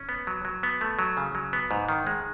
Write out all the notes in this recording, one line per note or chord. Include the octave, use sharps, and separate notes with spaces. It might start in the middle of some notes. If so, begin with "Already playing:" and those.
Already playing: C#4
B3
F#3
F#3
B3
A3
F#3
C#3
F#3
B3
G#2
D#3
G#3